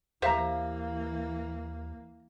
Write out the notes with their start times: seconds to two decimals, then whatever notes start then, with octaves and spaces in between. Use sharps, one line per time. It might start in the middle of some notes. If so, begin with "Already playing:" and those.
0.22 D#2 E3 A#3 G4 C5 E5 F5 A#5